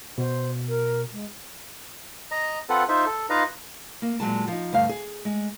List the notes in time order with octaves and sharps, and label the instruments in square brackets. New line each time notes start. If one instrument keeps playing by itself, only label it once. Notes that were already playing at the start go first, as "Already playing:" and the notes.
[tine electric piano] B2 [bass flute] C5
[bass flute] A#4
G#3
[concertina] D#5 A#5
C4 F4 A4 B4 F#5
D#4 F4 C5 E5
A4
D#4 F4 B4 D#5 F5 A#5
[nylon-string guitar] A#3
A#2 F#3 G#3 A5
F3 D#4
D2 G2 F5
G#4
G#3